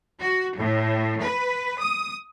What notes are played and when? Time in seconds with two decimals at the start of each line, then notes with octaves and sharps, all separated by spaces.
0.21 F#4
0.58 A2
1.23 B4
1.81 D#6